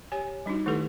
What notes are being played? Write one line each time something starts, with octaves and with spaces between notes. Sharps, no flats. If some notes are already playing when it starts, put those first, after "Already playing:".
G4 C#5 G#5
G3 D4 D#4 F#4
D#3 A3 E4 G4 A4 B4